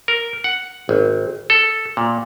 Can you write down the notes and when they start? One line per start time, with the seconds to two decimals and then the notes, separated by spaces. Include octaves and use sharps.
0.08 A#4
0.44 F#5
0.89 G#1
1.50 A4
1.97 A#2